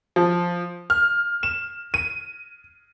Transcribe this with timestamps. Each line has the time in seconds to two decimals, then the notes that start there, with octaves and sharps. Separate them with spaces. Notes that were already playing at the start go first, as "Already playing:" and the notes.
0.16 F3
0.90 F6
1.43 E7
1.94 D#7